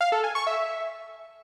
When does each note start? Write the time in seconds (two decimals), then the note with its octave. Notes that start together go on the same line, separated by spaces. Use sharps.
0.01 F5
0.12 A4
0.24 G#5
0.35 C#6
0.47 E5